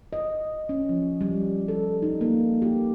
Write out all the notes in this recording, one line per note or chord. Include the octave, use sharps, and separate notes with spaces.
D#5
C#4
F3
G3
A4
D#4
A#3
G4